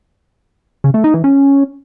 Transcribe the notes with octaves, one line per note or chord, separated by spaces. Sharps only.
C#3
A3
D#4
E3
C#4